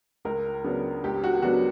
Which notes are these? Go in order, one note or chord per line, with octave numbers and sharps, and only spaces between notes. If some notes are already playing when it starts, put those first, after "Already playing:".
C#2 A#4
C#3 F#3 B3 D4
C#2 G4
F#4
C#3 F#3 B3 D4 F#4